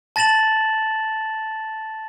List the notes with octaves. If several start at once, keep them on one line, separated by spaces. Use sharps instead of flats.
A5 A6 A#6 E7 F#7